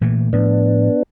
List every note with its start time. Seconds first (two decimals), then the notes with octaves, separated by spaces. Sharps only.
0.01 A#2 E3 A3
0.33 A2 F3 B3 D4